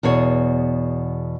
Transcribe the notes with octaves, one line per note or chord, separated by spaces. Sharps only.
E2 B2 G#4 C#5